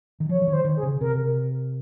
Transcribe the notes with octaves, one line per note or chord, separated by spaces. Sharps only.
D#3
F3 C#5
F3
D#3 C#5
C5
D#3
G#4
C#3
C3 A#4